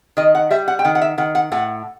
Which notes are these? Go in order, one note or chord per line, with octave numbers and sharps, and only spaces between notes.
D#3 D#5
F#5
G3 E5
F#5
G5
D#3 F#5
F#5
E5
D#3 F#5
F#5
A2 F#5